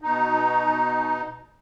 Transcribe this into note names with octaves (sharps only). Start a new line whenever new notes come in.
B2 D#4